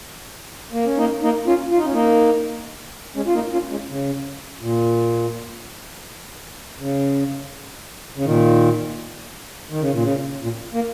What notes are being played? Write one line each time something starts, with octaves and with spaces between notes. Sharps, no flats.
A#3
C#4
A#3 D#4
A#3 D#4
C#4 F4
F4
D#4
C#4
A#3 D#4
G#3 C#4
F4
A#3 D#4
C#4 F4
G#3 C#4
C#3
A#2
C#3
C#3
A#2 D#3
D#3
C#3
A#2
C#3
A#2
A#3